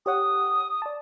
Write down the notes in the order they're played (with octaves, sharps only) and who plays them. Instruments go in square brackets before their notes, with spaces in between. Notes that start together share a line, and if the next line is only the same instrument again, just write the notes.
[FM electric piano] G4 C#5 F#5 [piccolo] D#6
[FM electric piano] D5 A5